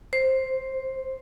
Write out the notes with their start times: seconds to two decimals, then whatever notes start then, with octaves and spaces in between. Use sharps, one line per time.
0.13 C5